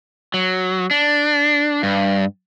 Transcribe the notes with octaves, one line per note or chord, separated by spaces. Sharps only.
F#3
D4
G2